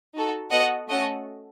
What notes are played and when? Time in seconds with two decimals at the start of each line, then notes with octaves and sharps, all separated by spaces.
0.14 D#4 F#4 A4
0.51 B3 F#4 A4 D#5 F#5
0.88 A3 C#4 F#4 A4 D#5 F#5